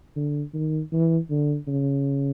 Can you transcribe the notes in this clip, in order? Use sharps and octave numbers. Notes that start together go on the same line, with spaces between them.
D3
D#3
E3
D3
C#3